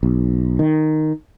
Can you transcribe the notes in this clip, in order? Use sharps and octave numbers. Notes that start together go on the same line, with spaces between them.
B1
D#3